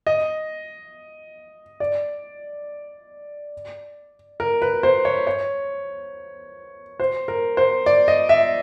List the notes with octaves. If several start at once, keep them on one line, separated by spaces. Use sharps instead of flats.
D#5
D5
A#4
B4
C5
C#5
C#5
C5
A#4
C5
D5
D#5
E5